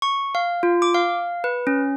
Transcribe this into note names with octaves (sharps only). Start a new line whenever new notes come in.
C#6
F5
F4
D6
F5
B4
C#4